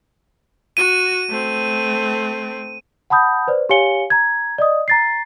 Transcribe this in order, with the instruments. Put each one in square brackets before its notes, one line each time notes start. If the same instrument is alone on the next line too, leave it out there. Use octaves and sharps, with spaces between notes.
[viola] F#4 [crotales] D#7
[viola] A3 C4
[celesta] F#5 A5 B5 D#6 G6
B4 C5 D5
G4 C#5 F5 G#5 C#7 G7
A#5 G#6
D5 D#5 D#6
A#5 A6 C7